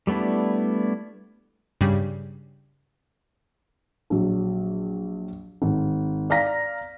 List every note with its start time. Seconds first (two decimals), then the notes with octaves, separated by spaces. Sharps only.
0.07 G3 A3 B3 D4 E4
1.81 G2 C#3 G3
4.10 A#1 F#3
5.62 G#1
6.30 D5 F5 A#5 A#6 B6